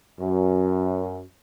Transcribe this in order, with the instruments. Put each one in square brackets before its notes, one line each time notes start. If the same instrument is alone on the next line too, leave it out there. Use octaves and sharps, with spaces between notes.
[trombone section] F#2